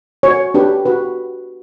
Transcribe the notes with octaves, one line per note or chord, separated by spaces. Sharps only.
F#4 C#5
D4 G4 B4
F#4 B4